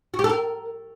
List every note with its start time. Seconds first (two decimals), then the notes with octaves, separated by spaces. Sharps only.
0.14 F#4
0.19 G4
0.24 A4
0.29 A#4